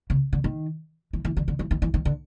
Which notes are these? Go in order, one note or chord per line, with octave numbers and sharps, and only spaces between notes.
C#3
D3
D#3
E3
E3
D3
D3
E3
D#3
E3
D#3
D3